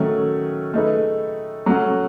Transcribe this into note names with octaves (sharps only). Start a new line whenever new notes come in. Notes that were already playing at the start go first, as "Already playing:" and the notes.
Already playing: D#3 F#3 A3 C#4
A3 D#4 G#4 B4
F#3 A3 C#4 F#4